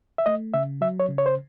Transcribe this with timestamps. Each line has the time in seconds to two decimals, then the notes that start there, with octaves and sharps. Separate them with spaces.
0.18 E5
0.26 A3 D#5
0.54 C#3 E5
0.81 F#3 E5
1.00 C#5
1.09 C#3
1.18 C#5
1.26 C5